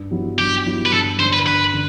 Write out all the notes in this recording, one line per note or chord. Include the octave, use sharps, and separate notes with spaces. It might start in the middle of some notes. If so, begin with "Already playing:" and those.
Already playing: G2
F#3 B3 E4 G4
G2 G4
F#3 B3 E4 G4
B4
G2 A4
D3 G3 C5
B4
G2 B4
D3